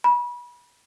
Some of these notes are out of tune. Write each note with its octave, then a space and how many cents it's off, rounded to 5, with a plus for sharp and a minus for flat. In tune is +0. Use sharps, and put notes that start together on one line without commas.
B5 -30